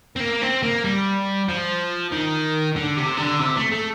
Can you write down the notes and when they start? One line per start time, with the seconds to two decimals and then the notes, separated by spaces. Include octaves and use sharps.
0.16 C4
0.20 A#3
0.42 C4
0.63 A#3
0.84 G3
1.49 F3
2.12 D#3
2.76 D3
2.97 C3
3.18 D3
3.41 C3
3.57 A3
3.72 A3